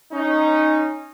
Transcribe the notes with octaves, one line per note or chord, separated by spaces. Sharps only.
C#4 D#4